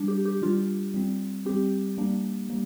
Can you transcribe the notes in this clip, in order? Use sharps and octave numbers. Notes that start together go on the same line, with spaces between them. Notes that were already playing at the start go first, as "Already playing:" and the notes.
Already playing: G3 D4
G4
G4
G3 D4 F4
G3 C4
G3 C4 G4
G3 A#3 D4
G3 A#3